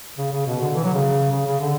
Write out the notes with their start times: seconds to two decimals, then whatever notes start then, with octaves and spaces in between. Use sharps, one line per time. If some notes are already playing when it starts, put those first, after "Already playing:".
0.18 C#3
0.32 C#3
0.47 B2
0.61 D3
0.75 E3
0.84 F#3
0.94 C#3
1.32 C#3
1.46 C#3
1.60 D3